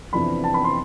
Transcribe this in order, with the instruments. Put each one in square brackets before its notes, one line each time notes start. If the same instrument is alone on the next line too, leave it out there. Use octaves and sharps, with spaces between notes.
[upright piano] F2 C3 E3 B3 D4 B5
A5
B5
C6